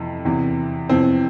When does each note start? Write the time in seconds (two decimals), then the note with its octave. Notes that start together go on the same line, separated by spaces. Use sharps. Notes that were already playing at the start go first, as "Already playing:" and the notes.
Already playing: F2 C3 E3
0.25 E2 C3 E3
0.89 F2 C3 E3 C4